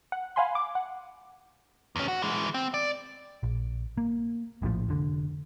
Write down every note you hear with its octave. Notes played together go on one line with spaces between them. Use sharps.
F#5
F5 F#5 G#5 B5 C6
D6
F#5
E2 C#4
F#4
E3 G#3
C4
D5
A#1
A#3
A#1 A2 C3 F3
F1 D3